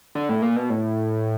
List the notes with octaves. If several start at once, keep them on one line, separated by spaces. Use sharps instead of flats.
D3
A2
A#2
B2
A2